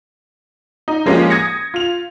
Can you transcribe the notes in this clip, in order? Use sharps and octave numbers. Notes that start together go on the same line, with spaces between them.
D#4
F3 G#3 A#3 C#4 F4 G4
D#6 G#6 A#6 C#7
F4 F7